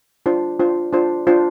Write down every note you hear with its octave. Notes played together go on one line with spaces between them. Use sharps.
D4 F4 C5
D4 F4 C5
D4 F4 C5
D4 F4 C5